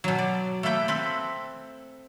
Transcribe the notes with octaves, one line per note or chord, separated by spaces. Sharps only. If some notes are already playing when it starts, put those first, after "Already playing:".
B2 F#3
D5
A3 A#3 A4 B4 G5
C4 A4 B4